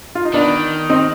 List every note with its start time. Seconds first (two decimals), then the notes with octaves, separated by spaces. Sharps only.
0.15 F4
0.25 D#4
0.34 D#3 B3 D4
0.89 C4 D#4